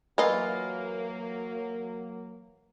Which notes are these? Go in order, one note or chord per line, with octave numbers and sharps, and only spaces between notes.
E3 F#3 A#3 F4 A#4 D#5